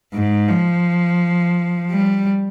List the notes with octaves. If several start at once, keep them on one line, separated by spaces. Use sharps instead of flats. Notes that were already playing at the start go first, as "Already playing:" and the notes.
G#2
F3
G3